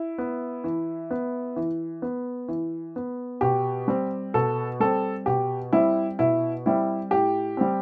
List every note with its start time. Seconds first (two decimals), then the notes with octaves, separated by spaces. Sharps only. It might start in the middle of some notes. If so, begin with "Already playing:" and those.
Already playing: E4
0.18 B3
0.64 E3
1.11 B3
1.56 E3
2.02 B3
2.48 E3
2.96 B3
3.41 B2 G4
3.88 G3 C4
4.34 B2 A4
4.80 G3 C4 A4
5.26 B2 G4
5.73 G3 C4 E4
6.19 B2 E4
6.66 G3 C4 E4
7.11 A2 G4
7.57 G3 C4